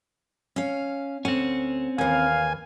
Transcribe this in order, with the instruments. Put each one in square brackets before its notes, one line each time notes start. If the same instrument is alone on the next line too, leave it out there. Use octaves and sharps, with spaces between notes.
[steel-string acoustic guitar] C#4 F5
[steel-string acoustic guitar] D2 F#5 [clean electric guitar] C4 C#4
[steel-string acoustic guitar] D#2 E3 [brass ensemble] F5 [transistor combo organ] G#5